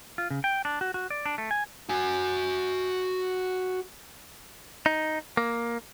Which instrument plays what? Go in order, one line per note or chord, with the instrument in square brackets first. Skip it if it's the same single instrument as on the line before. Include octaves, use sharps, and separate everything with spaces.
[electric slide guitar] F4
C#3
G5
D4
F#4
F#4
D5
D4
A3
G#5
[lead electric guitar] F#4 G#5
[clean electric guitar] D#4
A#3